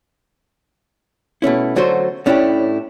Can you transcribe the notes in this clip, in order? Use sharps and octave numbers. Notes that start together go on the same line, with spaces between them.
B2 A3 C#4 E4
D3 F#3 A3 F#4 C5
A2 C#4 D4 E4 F#4 G4